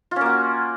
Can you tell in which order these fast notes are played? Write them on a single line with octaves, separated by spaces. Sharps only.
F4 C#4 A#3 F#4